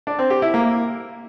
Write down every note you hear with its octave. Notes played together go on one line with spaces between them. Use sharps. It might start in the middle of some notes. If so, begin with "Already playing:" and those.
D4
C4
G4
E4
A#3